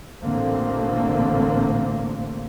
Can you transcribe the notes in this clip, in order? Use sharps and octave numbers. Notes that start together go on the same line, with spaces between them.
A1 A#2 D3 A3 A#3 C4